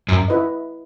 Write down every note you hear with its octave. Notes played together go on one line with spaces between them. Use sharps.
F#2
E4 B4 D#5